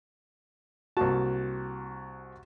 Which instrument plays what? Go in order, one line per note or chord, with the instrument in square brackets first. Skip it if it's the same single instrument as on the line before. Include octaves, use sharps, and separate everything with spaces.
[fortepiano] C2 A#3 A5 [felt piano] F#4